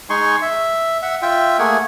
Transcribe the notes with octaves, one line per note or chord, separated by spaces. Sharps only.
G#3 D#4 G#5 C6 C#6
E5
E5 F#5
F4 E5 G5
A3 A#3 G#4 F#5 G#5